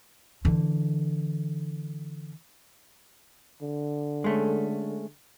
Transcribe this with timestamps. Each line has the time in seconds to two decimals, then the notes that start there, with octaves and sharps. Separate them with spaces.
0.45 D3 E3
3.62 D3
4.24 G#3 A3 C#4